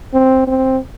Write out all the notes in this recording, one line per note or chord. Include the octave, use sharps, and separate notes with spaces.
C4
C4